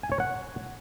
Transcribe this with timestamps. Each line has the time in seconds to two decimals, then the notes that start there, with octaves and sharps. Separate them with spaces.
0.03 G#5
0.12 C#5
0.20 F#5